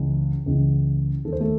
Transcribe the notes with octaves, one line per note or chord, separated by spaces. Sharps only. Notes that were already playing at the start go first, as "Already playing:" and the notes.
Already playing: C#2 C#3 E3
C#2 C#3 E3
D#2 D#3 A4 C5
A3 A4